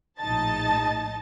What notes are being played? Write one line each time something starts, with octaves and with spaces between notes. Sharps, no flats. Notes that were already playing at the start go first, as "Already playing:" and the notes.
A#1 A2 D#4 D#5 A5 A6